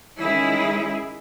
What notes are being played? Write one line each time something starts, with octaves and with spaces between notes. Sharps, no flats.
D#3 G#3 C#4 E4 G#4